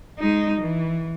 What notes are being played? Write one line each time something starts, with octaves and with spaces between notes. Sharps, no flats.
G#3 D#4
E3